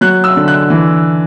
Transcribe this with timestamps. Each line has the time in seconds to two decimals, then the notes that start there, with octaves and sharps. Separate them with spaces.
0.01 F#3 F#6
0.24 E6
0.36 D3
0.48 F#6
0.70 E3